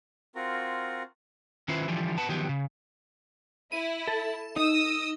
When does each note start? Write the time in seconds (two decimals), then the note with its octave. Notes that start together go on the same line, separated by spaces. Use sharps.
0.35 C4 F4 F#4 A#4
1.68 D#3 C#4 E4 F4 B4 C5
1.88 D3 E3 F3 G3
2.18 B3 B4 A5
2.29 D#3 F3 F#3 B3 G4
2.49 C#3
3.72 E4 D#7
4.07 A4
4.56 D#4 D#6 E6